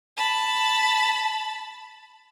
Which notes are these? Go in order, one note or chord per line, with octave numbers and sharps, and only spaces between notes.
A5 B5